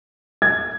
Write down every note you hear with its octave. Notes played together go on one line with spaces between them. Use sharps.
G#6